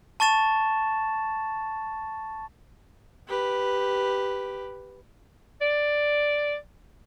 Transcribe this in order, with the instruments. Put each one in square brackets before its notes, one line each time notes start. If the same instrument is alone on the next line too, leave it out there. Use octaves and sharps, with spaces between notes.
[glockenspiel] A5 C#6 A6 E7
[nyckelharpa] G4 B4
[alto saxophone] D5